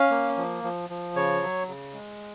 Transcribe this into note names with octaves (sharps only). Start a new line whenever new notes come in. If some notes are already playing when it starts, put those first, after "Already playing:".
Already playing: C#4 F5
A#3
F3
F3
F3
C#3 C#5
F#3
C#3
G#3